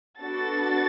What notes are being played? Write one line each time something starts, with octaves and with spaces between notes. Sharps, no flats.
B3 D4 F#4 A4 A6